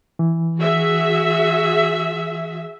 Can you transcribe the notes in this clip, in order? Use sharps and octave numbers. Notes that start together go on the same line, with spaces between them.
E3
F#4 G#4 E5